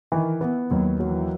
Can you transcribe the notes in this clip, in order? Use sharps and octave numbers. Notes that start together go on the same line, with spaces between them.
D#3 E3
E3 B3
D#2 F#3
E3 F#3